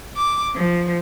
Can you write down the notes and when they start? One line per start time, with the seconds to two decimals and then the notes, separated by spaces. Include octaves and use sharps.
0.15 D6
0.54 F3